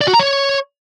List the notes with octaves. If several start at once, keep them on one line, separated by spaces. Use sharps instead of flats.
D5
F#4
A#5
C#5